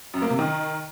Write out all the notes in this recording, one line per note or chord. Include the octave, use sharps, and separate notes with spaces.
F#2
A#3
C3
D#3